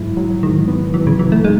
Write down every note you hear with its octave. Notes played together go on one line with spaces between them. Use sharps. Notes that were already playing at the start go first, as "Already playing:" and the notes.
Already playing: G#2 F#3 E4
F#3
G#2 D#3
B3
E3 F#3
C#3
E3 F#3
A3
G#3 D#4